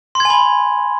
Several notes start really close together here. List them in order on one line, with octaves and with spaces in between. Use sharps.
C6 G#6 G#5 B5